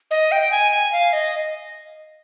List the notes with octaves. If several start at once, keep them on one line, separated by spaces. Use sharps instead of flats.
D#5
G5
G#5
G#5
F5
D#5